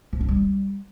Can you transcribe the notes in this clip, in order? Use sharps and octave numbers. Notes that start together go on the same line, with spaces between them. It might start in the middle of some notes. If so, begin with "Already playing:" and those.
F3
D4
G3